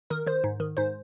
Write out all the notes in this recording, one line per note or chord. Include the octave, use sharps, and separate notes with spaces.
D#3 A#4
D#3 C5
G#2
D#3
G#2 C5